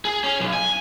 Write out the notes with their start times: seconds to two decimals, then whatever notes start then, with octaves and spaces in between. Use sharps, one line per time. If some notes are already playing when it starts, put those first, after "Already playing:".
0.05 G#4
0.24 C#4
0.40 B1
0.53 G#5